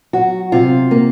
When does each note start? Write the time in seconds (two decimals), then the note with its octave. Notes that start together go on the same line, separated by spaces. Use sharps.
0.13 F#3 F#4
0.52 C3 F4
0.91 A#3